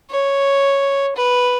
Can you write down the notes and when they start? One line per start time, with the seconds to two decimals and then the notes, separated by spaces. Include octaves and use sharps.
0.10 C#5
1.16 B4